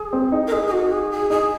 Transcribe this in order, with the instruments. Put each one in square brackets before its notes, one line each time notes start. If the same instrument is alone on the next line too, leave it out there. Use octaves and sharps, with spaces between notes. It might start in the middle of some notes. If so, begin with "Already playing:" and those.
Already playing: [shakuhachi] G#4
[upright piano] C4
D#4
[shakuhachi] A#4
[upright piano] D#4 [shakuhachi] G#4
[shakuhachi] G#4
F#4
G#4
G#4
[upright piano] D#4 [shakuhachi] G#4